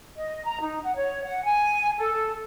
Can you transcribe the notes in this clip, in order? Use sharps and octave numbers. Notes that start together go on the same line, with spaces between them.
D#5
A#5
D#4
F#5
C#5
F#5
G#5
A4